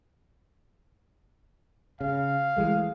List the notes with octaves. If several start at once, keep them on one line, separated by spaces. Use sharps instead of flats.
C#3 F5
E3 G#3 A3